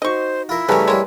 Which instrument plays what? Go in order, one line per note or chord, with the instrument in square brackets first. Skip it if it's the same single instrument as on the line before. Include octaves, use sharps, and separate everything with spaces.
[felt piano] D#4 F#4 [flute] C5 [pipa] D#5 C#6
[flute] E4 [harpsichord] F4 A#4
[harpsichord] C#3 G3 A3 [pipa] E3 C#4 [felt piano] B4 A5 A#5
[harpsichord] G3 C#5 [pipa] G#3 A#3